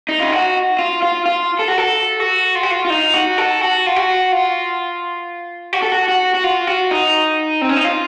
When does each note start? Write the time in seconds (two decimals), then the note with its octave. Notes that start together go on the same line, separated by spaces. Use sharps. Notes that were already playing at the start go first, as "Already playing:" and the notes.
0.09 D#4
0.20 F4
0.32 F#4
0.79 F4
1.02 F4
1.26 F4
1.59 A4
1.68 F#4
1.78 A4
2.20 F#4
2.55 F4
2.63 F#4
2.71 F4
2.85 F4
2.90 D#4
3.14 F#4
3.38 A4
3.61 F#4
3.86 F4
3.96 F#4
4.32 F4
5.73 F#4
5.82 A4
5.92 F#4
6.08 F#4
6.34 F#4
6.44 F4
6.67 F#4
6.91 D#4
7.61 C4
7.69 C#4
7.77 D#4
7.84 F4